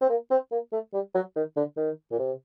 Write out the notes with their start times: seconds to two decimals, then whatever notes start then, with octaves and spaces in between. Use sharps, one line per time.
0.01 C4
0.10 A#3
0.31 C4
0.52 A#3
0.73 A3
0.93 G3
1.15 F#3
1.36 D#3
1.57 D3
1.77 D#3
2.11 A#2
2.19 C3